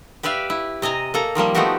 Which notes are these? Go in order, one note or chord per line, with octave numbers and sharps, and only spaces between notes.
G4 B4 D5 E5 F5
E4
C3 D#5 G#5 A#5
A#3 A4 A#5
D#3 F3 G3 A#3
F3 A3 B3 D#4 F#4 G4